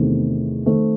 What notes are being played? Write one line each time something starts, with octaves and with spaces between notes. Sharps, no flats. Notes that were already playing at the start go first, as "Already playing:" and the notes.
Already playing: E2 C3 D#3 A3 C4
D#3 A3 C4